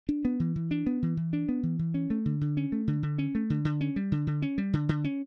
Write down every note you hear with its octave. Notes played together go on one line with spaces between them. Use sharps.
D4
B3
E3
E3
D4
B3
E3
E3
D4
B3
E3
E3
C#4
A3
D3
D3
C#4
A3
D3
D3
C#4
A3
D3
D3
C#4
G3
D3
D3
C#4
G3
D3
D3
C#4